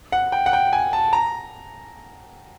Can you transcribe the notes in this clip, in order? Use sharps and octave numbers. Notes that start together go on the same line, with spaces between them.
F#5
G5
F#5
G5
G#5
A5
A#5